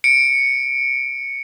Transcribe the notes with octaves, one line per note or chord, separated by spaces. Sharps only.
C#7 D7